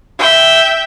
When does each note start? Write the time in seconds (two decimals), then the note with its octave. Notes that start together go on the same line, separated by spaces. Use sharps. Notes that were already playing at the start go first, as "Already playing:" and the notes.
0.19 E5 G5